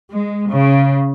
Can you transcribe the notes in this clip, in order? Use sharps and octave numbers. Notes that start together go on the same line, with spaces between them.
G#3
C#3